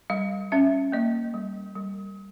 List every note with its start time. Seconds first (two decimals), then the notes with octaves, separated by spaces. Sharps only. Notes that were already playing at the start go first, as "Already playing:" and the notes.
0.10 G3 F5
0.52 C#4 E5
0.92 A#3 D#5
1.34 G3
1.76 G3